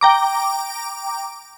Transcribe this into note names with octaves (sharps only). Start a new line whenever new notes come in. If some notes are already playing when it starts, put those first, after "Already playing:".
G5 A#5 D6